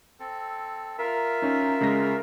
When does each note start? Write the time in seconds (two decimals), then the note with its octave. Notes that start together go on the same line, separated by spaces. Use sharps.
0.20 C4 A4
0.98 F4 A#4 E5
1.42 C#4 D#4
1.81 C#3 G#3 A#6